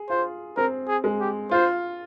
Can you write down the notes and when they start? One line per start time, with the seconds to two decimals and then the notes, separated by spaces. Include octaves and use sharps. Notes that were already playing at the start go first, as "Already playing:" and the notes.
Already playing: G#4
0.09 F4 C5
0.57 C4 A#4
0.88 G#4
1.04 G#3
1.20 G4
1.51 F4 C5